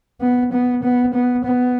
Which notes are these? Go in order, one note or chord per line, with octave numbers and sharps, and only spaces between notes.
B3
B3
B3
B3
B3